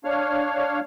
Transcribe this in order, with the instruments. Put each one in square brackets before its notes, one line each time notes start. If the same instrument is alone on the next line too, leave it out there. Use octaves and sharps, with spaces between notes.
[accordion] D4 C#5 F5 F6